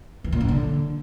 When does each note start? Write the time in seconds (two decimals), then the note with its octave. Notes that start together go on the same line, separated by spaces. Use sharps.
0.24 E3
0.32 A#2
0.41 F#2
0.49 D3